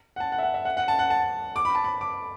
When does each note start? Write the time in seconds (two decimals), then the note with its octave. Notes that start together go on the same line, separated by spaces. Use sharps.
0.16 F#5
0.20 A5
0.32 F#5
0.38 E5
0.43 F#5
0.54 E5
0.65 F#5
0.77 F#5
0.88 A5
0.99 F#5
1.10 A5
1.56 D6
1.65 B5
1.75 A5
1.84 B5
2.01 D6